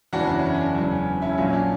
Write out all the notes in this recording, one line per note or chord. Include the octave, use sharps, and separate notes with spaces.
F#1 E2 C#3 E3 D4 F#4
D4
C#4 E4
C#4
D4
E1 E2 C#3 F#3 D4
C#4
C#4 E4
A#1 A#2 F#3 C#4
D4